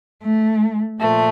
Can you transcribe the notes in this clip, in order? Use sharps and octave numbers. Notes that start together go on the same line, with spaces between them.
A3
A#2 F3 A3